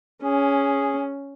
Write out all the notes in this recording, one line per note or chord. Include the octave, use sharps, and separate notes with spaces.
C#4 G#4